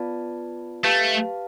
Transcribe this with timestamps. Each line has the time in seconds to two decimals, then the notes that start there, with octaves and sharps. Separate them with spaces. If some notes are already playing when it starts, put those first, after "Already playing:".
Already playing: B3 F4 B4 D5 A5
0.84 A3 G4 B4 F5 A5